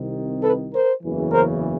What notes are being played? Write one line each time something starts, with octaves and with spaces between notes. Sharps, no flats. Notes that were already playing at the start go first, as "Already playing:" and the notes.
Already playing: C2 C3 D#3
A4 B4
A#4 C5
F#1 E2 C#3 E3
A#4 C5